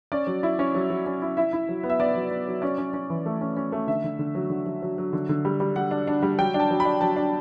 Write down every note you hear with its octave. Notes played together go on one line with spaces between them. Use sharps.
C#4 D5
F#3
E4
C#4
F#3
F#3
C#4
E4
E4 E5
E4
F#3
B3
E5
B3 D5
F#3
B3
F#3
C#4 D5
C#4
C#4
E3
A3
C#4
C#4
A3
D3 E5
D3
D3
F#3
D3
F#3
F#3
F#3
D3
D3
G3
G3
G3 F#5
D4
D4
G3
F#3 G5
D4
A5
F#3
B5
D4
F#3 A5
D4